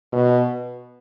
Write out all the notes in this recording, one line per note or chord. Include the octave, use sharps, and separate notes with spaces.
B2